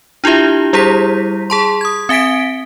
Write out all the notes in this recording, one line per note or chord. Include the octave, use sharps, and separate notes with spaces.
D4 E4 F4 G4 E5
G3 E4 G4 G#4 C5 B6
G#4 A5 C6
D#6 G#6
C4 E5 G#5 B6 D7